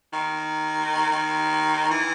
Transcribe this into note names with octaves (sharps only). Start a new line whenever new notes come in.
D#3
D#3
E3